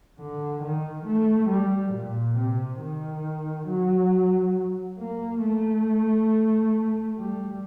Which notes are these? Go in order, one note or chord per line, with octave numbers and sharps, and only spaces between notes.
D3
D#3
A3
G3
A#2
C3
D#3
F#3
A#3
A3
G3